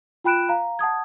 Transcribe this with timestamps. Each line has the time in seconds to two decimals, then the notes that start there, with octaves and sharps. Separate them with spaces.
0.24 F4 G5 B5 F#6 D7 E7
0.49 F5 A#5
0.79 F#5 A5 D#6 G#6